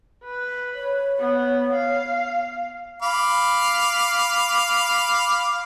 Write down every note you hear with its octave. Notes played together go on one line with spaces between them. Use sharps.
B4
C#5
B3
F5
F5 B5 D6